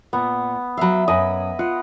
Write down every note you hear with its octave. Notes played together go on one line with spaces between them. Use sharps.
A#2 B3
F#3 E5 F5 B5
F#2 D#5 G#5 B5
F4 F#5